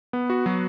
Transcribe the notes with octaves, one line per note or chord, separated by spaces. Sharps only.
B3
F#4
F#3